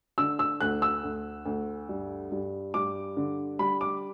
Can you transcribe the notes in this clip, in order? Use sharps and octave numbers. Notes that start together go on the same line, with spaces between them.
D3 E6
E6
D2 F#6
E6
D2
D2
G2
G2
G2 D6
D3
G3 B5
D6